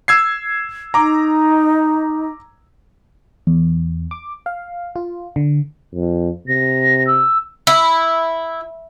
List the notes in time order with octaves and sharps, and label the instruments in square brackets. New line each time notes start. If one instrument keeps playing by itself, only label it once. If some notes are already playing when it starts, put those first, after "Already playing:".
[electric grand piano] E6 G#6 C7
[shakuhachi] D#4 [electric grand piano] A#5 D6
[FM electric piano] E2
D6
F5
F4
D3
[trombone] F2
[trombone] C3 [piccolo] A#6
[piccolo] E6
[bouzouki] E4